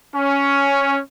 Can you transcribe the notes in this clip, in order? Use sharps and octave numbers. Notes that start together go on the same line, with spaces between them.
C#4